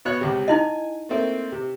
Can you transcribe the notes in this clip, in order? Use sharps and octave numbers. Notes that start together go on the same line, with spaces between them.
B2 C#5 F#6
C#2 C3
D#4 E4 D#5 G#5
A3 A#3 C4
C3